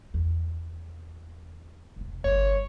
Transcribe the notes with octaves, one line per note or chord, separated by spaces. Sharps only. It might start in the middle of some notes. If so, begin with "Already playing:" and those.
E2
E1 C3
G1 G2 C#5